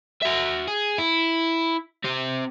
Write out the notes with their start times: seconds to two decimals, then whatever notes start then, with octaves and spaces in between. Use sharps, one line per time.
0.22 F#4 E5
0.67 G#4
0.98 E4
2.04 C4 G4